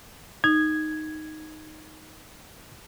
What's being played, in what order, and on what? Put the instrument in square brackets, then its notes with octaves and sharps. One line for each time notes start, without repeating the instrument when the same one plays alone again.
[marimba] D#4 [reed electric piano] G#6